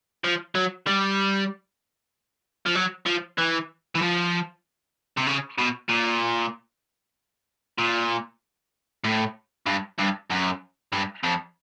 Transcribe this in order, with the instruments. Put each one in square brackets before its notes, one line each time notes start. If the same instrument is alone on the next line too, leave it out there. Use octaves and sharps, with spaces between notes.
[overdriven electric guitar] F3
F#3
G3
F3
F#3
F3
E3
E3
F3
C3
C#3
B2
A#2
A#2
A2
G2
G2
F#2
G2
F2